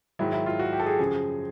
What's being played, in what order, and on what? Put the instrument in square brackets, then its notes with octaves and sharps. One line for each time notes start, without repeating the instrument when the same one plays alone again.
[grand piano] G#2 D#3 F#3 E4
E4
F4
F#4
G4
A4
G#4
F#2 C#3 F3 G#4